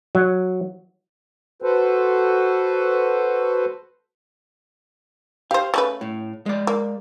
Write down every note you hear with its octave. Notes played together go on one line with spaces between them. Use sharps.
F#3
F#4 A4 B4 C5
G4 C5 F5
C#3 A3 B4
A2
G#3 D5
A#3